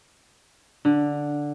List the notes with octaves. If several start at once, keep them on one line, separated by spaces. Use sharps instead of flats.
D3